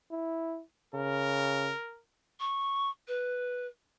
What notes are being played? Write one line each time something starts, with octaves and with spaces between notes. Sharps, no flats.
E4
C#3 A#4
C#6
B4